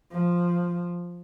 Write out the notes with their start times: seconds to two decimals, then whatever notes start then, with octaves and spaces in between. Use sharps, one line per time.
0.12 F3